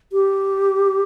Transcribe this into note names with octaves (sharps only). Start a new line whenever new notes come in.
G4